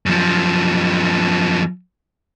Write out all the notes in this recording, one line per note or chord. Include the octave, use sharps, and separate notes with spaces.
F#2 F3